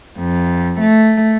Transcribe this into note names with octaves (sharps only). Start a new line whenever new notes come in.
F2
A3